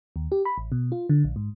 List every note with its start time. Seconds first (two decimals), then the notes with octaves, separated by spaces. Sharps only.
0.16 D#2
0.32 G4
0.45 B5
0.58 A1
0.72 B2
0.92 F4
1.09 D3
1.24 A#1
1.36 G#2